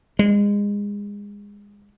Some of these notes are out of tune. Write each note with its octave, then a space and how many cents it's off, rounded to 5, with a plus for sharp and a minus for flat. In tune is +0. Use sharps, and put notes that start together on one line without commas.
G#3 -25